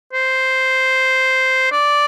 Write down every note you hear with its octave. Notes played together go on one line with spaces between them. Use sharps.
C5
D5